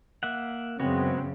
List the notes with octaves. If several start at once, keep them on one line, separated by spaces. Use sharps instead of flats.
A#3 E5 F#5
F#2 C#3 G#3 B3 C4 F#4